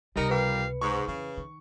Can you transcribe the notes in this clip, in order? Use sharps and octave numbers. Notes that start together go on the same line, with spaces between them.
C#2 C3 G3 D#4 A#4 C#7
F2 G4 B4 F5
G#2 C#6
F2 C#3 E3
D#3